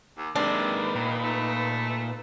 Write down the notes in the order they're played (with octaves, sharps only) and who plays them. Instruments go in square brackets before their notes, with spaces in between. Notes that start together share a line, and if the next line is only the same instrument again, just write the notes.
[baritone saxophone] D#2 [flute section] D6
[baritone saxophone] C3 [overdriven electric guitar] G#3 A#3 [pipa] D4 [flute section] D#4 B4
[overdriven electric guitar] A#2 [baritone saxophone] D#3
[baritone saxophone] A3